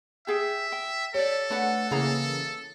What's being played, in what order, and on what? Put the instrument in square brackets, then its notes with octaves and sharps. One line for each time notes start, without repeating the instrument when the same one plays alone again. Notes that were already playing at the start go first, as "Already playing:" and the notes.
[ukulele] G4 G#4 G5 [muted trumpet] E5
[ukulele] G5
[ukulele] G4 D5 [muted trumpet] A4 [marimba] C#5
[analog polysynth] A3 [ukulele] D4 B4 F#5
[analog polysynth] C#3 E3 A#3 [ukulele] G#4 F5 A#5